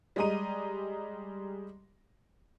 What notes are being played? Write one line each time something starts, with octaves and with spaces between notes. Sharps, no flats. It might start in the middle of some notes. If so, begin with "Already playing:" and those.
G3 G#3 D#5 A#5 D#7